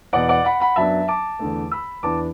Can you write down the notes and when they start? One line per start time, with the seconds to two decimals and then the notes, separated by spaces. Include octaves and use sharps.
0.13 E2 B2 B3 D5 F#5
0.29 D5 F#5
0.44 F#5 B5
0.60 F#5 B5
0.76 F#2 F#3 B3 D4 E5 A5
1.08 A5 D6
1.39 E2 D3 A3
1.72 B5 E6
2.03 E2 E3 B3 D4 A5 D6